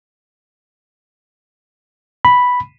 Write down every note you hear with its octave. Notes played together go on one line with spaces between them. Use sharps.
B5